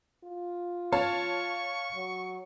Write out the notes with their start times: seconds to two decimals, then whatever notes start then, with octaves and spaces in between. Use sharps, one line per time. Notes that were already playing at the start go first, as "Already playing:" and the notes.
0.24 F4
0.92 C#5 F5 A5 C#6
1.96 F#3